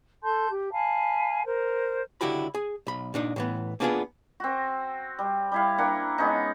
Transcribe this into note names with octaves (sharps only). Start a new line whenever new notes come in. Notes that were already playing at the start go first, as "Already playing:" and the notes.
A4 A5 C6 G6
G4
F5 G#5 A5 B5
A#4 C5
C#2 D3 E4 F#4 G4 B5
G#4
B1 B5
A#2 D4 D#4
A2 E3 B3
A#3 B3 D4 F4 F#4 G#4
C4 F#4
G3
G3 E4 F5
A#3 D4 F#5
G#3 B3 C#4 D#4